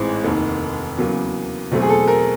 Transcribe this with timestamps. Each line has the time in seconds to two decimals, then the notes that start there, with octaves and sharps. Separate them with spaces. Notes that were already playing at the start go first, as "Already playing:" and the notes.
Already playing: A1 G#2 E3 G#3 C4
0.24 F1 D#2 D#3
0.97 E2 C#3 F#3 A#3
1.72 E2 B2 F#3 A3 C4
1.82 G#4
1.89 A4
2.08 A#4